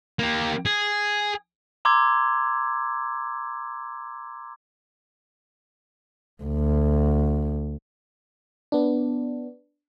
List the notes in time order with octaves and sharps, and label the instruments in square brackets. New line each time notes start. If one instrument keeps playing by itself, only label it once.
[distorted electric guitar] A#3 G4
G#4
[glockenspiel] A#5 C6 D6 E6 G#6
[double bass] D2
[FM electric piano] B3 D4